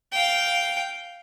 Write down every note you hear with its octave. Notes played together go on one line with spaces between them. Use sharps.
F5 G5